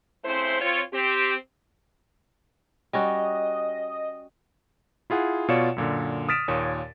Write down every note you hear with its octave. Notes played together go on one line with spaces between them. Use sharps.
C#3 A3 C4 E4 C5
C4 F4 C#5
C4 G4
G3 C#4 F#4 D#5
E4 F4 G#4 F#5
B2 F4 C#5 D5 C#7 E7
F#2 A#2 D3
D#6 F6 A6 B6 D7 E7
D#2 A#2 C#5 D#6